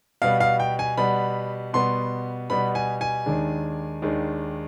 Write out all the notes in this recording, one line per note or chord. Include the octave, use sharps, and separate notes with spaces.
B2 G3 B3 F5
F5
G5
G#5
B2 G3 B3 B5
B2 G3 B3 C6
B2 G3 B3 B5
G#5
G#5
D#2 D#3 G#3 D4
D#2 D#3 G#3 D4